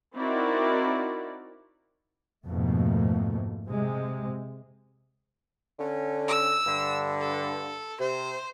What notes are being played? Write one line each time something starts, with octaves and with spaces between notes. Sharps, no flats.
C4 D#4 E4 F#4 A#4 D5
F2 G#2 B2 A3 A#3
C3 G#3
D3 C#4
E6
G2 D3
A4
C3 C5